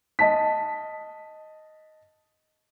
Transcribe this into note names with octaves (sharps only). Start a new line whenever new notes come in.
D#5 A5 B6